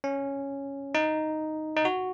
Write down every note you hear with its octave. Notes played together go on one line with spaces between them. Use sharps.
C#4
D#4
D#4
F#4